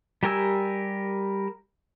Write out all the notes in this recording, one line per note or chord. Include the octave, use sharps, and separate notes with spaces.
G3 G4 A#4 G#5 E6